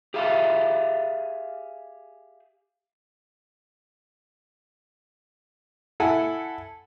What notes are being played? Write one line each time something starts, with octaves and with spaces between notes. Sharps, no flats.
G4 G#4 E5 F5
E4 A4 F#5 G#5